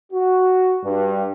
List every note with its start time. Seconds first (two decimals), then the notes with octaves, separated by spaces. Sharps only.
0.13 F#4
0.84 G2